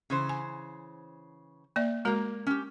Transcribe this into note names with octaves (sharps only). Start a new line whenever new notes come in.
C#3 E3 C5
G#5
A#3 D5 E5
G#3 A#3 F#4 A#4 A#5
C#4 G4